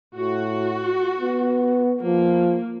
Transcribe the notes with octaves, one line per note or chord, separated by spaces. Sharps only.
A2 F#4
B3
F3 A#3